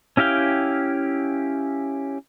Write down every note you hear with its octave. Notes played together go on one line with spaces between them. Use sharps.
C#4 E4 G4 F5 G5